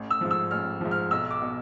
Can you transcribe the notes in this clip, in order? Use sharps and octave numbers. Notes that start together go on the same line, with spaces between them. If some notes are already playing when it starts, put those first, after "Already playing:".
Already playing: A1
E6
G#2 F3
E6
A1 F6
G#2 F3
F6
B1 E6
D6
B2